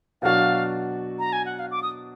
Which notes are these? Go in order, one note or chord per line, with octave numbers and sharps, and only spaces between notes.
B2 F#3 D4 F#4 F5
A#5
G#5
F#5
F5
D6
D#6